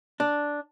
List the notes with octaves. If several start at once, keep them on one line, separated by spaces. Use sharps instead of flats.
D4